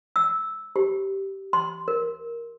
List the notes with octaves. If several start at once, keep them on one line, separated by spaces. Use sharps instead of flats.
E6
G4
C6
A#4